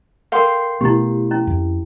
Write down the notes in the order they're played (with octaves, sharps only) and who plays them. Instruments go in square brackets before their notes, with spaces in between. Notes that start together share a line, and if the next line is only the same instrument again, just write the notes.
[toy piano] A4 A#4 [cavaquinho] F5 G5 C6
[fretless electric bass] B2 A3 B3 [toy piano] E4 G4
[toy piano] C#4 E4
[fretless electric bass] F2